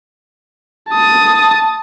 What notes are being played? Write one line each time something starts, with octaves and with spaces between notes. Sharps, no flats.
A5 D#6